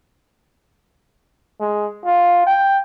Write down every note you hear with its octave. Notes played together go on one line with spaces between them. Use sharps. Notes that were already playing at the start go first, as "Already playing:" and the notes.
G#3
F4
G5